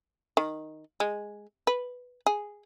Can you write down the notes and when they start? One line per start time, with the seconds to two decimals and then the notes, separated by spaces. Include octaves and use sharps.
0.37 D#3
1.00 G#3
1.67 B4
2.26 G#4